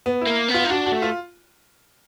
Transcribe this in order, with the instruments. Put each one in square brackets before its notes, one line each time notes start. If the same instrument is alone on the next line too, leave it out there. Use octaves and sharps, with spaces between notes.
[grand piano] B3
E4
[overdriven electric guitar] A#3
B3
[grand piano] F4
[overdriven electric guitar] D#4
[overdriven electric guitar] D4 [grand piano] F#4
[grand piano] F#4
[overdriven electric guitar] A3
[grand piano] F4